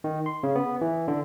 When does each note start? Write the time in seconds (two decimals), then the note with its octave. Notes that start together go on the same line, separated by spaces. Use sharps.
0.04 D#3
0.26 C6
0.43 C#3
0.56 B3
0.81 E3
1.08 D3